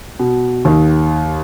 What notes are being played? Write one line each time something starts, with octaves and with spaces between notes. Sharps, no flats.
B2
D#2 D#3